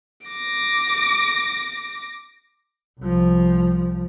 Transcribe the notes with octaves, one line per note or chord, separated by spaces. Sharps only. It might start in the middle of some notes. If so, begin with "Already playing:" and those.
D6 A#6
C2 F3